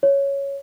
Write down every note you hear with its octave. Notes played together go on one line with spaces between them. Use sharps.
C#5